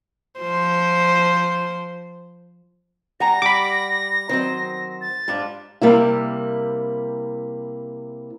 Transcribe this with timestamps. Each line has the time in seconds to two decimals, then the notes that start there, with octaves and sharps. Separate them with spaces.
0.40 F3 C5
3.20 G3 F#5 G#5 A#5 A#6
3.42 G3 B5 D6
4.29 D#3 F#3 C4 C5
5.01 A6
5.28 G#2 G3 D4 F4
5.82 C3 G3 A#3 E4